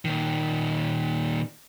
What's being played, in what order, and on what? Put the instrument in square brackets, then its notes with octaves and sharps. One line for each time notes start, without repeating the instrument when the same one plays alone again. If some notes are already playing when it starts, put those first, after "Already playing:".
[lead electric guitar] A#2 D#3